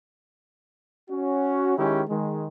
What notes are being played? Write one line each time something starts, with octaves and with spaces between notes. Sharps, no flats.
C#4 F#4
D#3 G#3 C#4 E4 G4
D#3 G#3